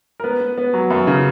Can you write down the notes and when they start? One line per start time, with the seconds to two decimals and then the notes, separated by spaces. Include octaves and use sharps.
0.20 A#4
0.24 B3 B4
0.40 B3
0.58 B3
0.74 F#3
0.90 F#2
1.07 C#3